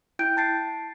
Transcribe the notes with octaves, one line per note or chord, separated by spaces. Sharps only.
E4 G5 G6 D7
A5 A6 C7 D7